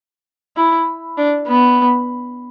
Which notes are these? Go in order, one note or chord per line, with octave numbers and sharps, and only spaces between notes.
E4
D4
B3